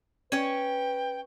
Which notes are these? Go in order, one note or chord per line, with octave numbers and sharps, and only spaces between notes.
C#4 B4 C#5 G5